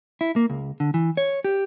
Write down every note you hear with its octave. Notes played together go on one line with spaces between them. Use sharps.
E4
A#3
C#2
D3
E3
C#5
G4